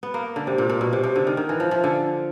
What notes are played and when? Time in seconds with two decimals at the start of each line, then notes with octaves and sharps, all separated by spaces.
0.03 B3
0.14 A#3
0.36 D3
0.47 C3
0.58 A#2
0.69 A#2
0.81 B2
0.93 C3
1.04 C3
1.15 D3
1.27 D#3
1.37 D#3
1.49 E3
1.60 F3
1.71 F3
1.84 D3